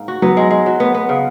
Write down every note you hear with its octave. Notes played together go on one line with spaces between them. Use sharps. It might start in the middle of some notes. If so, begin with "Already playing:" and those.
Already playing: G#2 A#3
F#4
F#3 B3
G#3
G#3
F#3
B3
B3
C#3